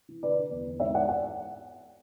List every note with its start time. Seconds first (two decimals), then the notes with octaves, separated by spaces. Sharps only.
0.08 E3
0.22 D3 B4 D5
0.37 D3
0.51 E2
0.66 E2
0.80 G#2 C#5 E5
0.94 E3 D5 F#5
1.09 D5 F#5